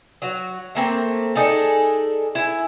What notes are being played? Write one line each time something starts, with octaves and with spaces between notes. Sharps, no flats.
F#3 F#4
A3 A#3 C4
D4 D#4 G#4 A4
E4 G#5